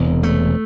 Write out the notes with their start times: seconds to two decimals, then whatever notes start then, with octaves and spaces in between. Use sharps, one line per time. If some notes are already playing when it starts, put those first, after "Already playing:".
Already playing: E1 E2 C3
0.23 A3